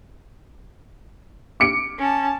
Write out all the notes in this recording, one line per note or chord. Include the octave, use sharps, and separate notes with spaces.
D6 C#7 D7
C#4 A5